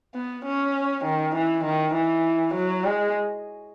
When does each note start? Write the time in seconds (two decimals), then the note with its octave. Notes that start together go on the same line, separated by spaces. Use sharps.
0.15 B3
0.45 C#4
1.05 D#3
1.35 E3
1.65 D#3
1.95 E3
2.55 F#3
2.85 G#3